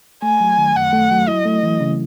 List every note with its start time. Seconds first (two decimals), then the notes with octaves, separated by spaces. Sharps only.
0.22 A3 G#5
0.40 F#3
0.58 D#3
0.76 F#2 F#5
0.93 A3
1.11 F#3
1.28 E4 D#5
1.46 A3
1.63 E3
1.81 C#3